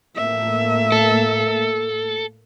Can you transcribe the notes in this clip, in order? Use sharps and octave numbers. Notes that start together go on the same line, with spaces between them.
A2 A3 A#3 E5
A4